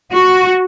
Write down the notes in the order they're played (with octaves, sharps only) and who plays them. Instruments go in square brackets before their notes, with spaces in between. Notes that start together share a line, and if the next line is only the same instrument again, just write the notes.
[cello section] F#4